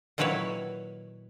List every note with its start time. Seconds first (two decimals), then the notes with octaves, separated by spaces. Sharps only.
0.18 A#2 D#3 F#3 E4 B4 C#5